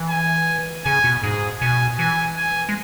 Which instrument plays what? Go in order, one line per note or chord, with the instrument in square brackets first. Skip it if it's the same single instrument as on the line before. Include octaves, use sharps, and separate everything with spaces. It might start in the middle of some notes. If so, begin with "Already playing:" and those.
Already playing: [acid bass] E3
[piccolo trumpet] G#5
[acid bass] C#3 [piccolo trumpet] G#5
[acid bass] B2
[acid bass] G#2 [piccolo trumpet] G#4
[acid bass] B2 [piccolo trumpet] G#5
[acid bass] E3 [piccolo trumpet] G#5
[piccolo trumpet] G#5
[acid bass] G#3